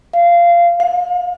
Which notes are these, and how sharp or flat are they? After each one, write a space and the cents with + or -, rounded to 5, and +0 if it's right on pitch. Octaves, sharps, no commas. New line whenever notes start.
F5 -20
F5 +40